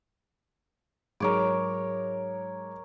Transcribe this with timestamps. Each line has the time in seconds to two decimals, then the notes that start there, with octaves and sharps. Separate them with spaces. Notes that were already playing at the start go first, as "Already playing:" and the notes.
1.20 G#2 F#3 G#3 A#4 C#5 D6